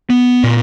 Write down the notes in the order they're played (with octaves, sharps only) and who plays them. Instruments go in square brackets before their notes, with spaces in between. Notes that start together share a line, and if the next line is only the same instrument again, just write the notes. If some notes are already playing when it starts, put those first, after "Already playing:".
[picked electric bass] B3
A#2